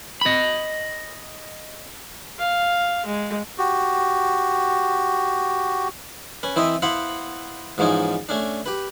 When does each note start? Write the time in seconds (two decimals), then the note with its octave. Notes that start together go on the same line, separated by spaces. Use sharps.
0.21 D#5 B5
2.38 F5
3.06 G#3
3.58 F#4 G4
6.43 C#4 B4
6.56 E3 C4 E4 D#5 E5
6.82 B3 E4 B4 C5 F5 F#5
7.78 G#2 E3 F3 C#4 D#4
8.29 A3 C#4 D4
8.66 G4 B4